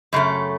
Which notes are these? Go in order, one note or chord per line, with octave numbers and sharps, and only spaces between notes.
F#2 C#3 A3